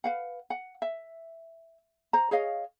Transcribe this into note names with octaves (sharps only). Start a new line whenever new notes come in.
B4 F5 F#5
F#5
E5
C5 A#5
G#4 C#5 D#5 F5